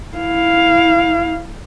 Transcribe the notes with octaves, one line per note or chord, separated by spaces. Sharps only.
E4 F5